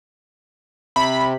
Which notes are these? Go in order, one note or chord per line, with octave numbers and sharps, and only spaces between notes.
C3 B5